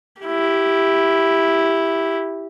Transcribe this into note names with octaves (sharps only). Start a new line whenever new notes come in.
E4 G4